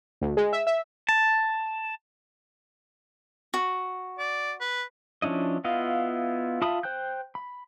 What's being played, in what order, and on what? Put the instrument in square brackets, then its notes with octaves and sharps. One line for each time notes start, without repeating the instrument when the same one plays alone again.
[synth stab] D2
G#3
E5
E5
[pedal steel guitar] A5
[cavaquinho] F#4
[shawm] D5
B4
[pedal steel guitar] F3 C#4 D4 E4 D#5
B3 E4 F4 D#5 F5
F4 E5 A5 B5 D#6
C5 G5 F#6 G6
B5